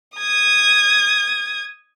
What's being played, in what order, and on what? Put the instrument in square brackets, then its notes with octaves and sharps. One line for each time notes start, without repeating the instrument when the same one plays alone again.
[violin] D#6 G#6